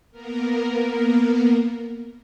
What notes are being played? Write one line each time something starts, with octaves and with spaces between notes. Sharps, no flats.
A#3 B3 A#4